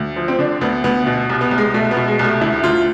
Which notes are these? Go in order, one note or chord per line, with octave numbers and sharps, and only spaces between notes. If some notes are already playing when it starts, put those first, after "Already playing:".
Already playing: D2
F3
C4
D3 D4
D2 B3
D2 B3
B2
C2
B3
C2
G#3
B2 A3
B3
B2
G#3
C2
A3
D2 E4
D2 F4